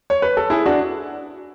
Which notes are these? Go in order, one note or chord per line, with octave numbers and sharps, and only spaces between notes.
C#5
B4
A4
E4 G#4
D4 F#4